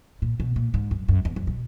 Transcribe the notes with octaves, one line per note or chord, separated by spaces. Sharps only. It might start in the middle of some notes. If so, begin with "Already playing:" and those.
A#2
B2
A#2
G#2
F#2
F#2
E2
F#2
B2